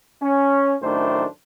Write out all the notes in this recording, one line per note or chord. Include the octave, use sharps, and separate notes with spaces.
C#4
F#2 A2 D#3 A3 D4 C5